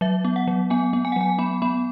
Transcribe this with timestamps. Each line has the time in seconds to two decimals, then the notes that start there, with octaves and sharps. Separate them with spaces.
0.01 F#3 E5
0.25 B3
0.36 F#5
0.47 F#3
0.70 B3 G#5
0.93 B3
1.05 G#5
1.12 F#5
1.16 F#3 G#5
1.39 B3 B5
1.62 B3 B5